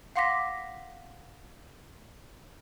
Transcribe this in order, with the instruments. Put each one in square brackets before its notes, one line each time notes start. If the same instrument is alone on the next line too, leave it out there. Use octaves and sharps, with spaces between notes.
[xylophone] F5 F#5 C6 D6 A#6 B6